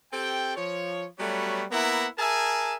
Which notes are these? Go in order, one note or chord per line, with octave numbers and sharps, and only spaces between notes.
C4 G4 A4 G5
F3 C#5
F#3 G3 A3 B3 F#4 C#5
A#3 B3 E4 E5 F#5 A#5
G#4 A#4 E5 G#5 A5